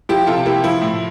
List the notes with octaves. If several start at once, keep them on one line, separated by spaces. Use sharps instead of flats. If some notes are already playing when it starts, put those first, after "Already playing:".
F3 E4 G4
C3 F4 A4
A#3 E4 G4
F3 E4
A2